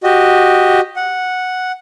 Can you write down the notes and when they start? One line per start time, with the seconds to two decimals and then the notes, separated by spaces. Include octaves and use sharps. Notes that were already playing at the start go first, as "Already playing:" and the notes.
0.04 F#4 G4 D#5
0.96 F#5